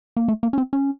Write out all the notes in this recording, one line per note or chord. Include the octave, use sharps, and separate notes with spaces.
A#3
A3
A#3
C#4
C4
C#4